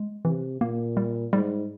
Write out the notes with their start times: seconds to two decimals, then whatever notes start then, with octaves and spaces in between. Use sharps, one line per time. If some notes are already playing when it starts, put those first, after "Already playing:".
Already playing: G#3
0.25 C3 E3
0.61 A#2 A#3
0.97 G3
1.33 G#2 G3